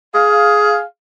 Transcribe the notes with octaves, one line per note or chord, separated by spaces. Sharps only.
G#4 F5